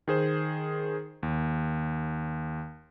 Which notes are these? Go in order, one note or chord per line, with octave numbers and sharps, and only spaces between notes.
D#3 G#4 C5
D#2